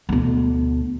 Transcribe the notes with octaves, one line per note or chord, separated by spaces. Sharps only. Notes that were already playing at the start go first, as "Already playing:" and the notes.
D2 B2